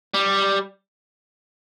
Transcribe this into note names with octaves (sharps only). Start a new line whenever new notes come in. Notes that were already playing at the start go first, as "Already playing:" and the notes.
G3